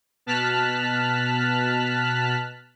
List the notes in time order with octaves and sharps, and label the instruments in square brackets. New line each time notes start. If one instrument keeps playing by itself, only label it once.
[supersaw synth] B2 A5 F6 F#6 B6